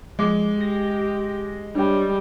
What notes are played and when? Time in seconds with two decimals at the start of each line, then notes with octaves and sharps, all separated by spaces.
0.19 F3 G#3 D6
0.61 G4 A#6
1.75 G3 D4 C#5 G5